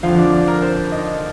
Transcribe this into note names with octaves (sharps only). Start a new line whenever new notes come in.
F2 D3 F3 F4 F5
D4 D5
D4 D5
A#4
C5
D#4 D#5